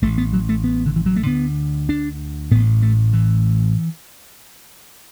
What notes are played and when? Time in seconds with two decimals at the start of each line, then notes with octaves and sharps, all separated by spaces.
0.02 A1 A2 A3
0.18 B3
0.33 F#3
0.49 A3
0.64 B3
0.86 D3
0.96 E3
1.06 F#3
1.16 A3
1.27 D2 D3 B3
1.89 D4
2.51 A1 A2 B3
2.82 A3
3.13 E3